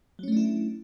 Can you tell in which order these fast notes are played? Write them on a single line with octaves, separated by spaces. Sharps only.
F#3 C#4 A3 D4 E4